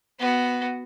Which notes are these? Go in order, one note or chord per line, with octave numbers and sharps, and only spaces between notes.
B3 F#4